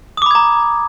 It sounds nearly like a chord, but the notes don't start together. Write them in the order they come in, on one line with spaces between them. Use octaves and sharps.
D#6 D6 B5 G#6 A#5